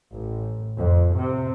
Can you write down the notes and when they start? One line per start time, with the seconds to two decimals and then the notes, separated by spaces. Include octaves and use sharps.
0.13 A1
0.78 F2
1.18 C3